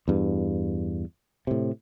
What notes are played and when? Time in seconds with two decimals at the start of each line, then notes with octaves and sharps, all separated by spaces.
0.08 E2 G2
1.47 A2 C3